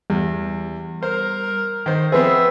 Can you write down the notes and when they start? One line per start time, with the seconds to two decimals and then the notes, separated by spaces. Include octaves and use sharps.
0.10 E2 G3
1.03 A#4 C5
1.86 D#3 C5
2.12 F3 B3 C4 G#4 B4 C5 E5